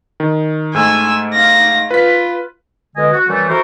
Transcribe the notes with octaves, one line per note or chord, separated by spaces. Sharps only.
D#3
G#2 A3 G#5 E6
F5 A#6
F4 B4 B6
B2 D3 G#3 D#5 G#5
F#4
F#2 E3 G3 A3
E4 F#4 A4 A#4 C5